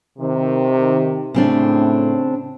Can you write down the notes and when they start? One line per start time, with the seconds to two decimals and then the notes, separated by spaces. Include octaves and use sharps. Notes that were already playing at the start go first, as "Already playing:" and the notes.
0.19 C3 D#3
1.34 A2 C#3 C4 D4